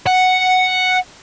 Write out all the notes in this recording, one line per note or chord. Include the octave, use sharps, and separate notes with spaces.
F#5